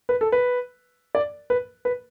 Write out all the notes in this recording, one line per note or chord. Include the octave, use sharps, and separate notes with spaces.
B4
A4
B4
D5
B4
B4